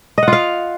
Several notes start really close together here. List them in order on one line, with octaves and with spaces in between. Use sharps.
D#5 F#5 F4 F5